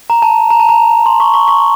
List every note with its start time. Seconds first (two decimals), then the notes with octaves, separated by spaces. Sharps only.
0.10 A#5
0.22 A5
0.50 A#5
0.59 A5
0.69 A#5
1.06 C6
1.20 C#6
1.34 C#6
1.48 C#6